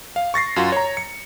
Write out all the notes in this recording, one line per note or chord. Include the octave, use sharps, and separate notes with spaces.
F5
C#6 A6 A#6 C7
F#2 F4 F#4
C#5 A#5
C#7